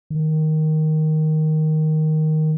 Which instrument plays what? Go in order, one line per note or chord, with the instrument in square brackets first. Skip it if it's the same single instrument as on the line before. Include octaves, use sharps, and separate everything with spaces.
[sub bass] D#3